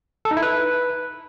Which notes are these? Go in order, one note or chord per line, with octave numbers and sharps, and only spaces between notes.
A4
D#4
E4
B4